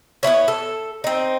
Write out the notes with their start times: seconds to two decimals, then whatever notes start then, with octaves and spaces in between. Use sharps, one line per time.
0.23 B3 C#4 E4 C#5
0.48 A4
1.04 C4 D#4